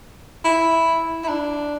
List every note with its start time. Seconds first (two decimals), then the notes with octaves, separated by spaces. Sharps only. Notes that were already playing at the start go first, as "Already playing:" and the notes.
0.44 E4
1.24 E4
1.28 D4